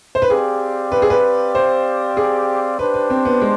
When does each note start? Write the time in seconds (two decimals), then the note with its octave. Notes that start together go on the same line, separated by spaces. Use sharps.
0.15 C5
0.22 B4
0.30 C4 G4 G#4 D5 F5
0.92 B4
1.02 G#4
1.10 B4
1.55 C5
2.17 G#4
2.79 D4 G4 B4 C5
2.94 B4
3.10 C4
3.25 B3
3.42 G#3